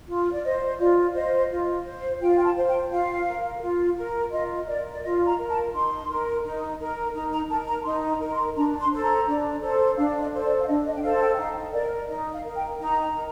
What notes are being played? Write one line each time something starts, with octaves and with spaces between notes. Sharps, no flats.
F4
D5
C5 D#5
F4 D5
C5 D#5
F4
C5
F4 G5
F5
G5
A5
C5
G5
F4 F5
A#4
F4
A#4
F4 D#5
A#4 D5
D5
F4 D#5
A#5
A#4
A5
D#4 C6
A#4
D#4
A#4
D#4 A#5
A#5
A#4 A5
A#5
D#4 C6
A#5
A#4
C6
D4 A#5
C6
A4 C5
A#5
D4
A4 C5
D4 F5
D#5
A4 C5
D5
F5
D4 D#5
D#5
G5
A4 C5 F5
G5
G5
D#4 F5
A#4 D5
D#4 D#5
F5
A#4
G5
D#4 A#5
A#4